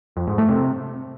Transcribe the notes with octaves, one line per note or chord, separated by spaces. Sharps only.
F2
G#2
A3
C3